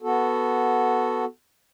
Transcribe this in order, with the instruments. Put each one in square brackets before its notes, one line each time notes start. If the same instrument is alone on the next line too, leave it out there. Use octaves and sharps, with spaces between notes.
[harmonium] B3 F#4 A4